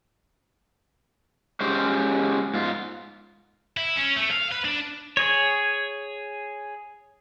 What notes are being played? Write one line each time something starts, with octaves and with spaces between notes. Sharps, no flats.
G#3 C#4 G4 C5
G#2 F4
E4
C#4
A3
F5
B4
D4
G#4 C#5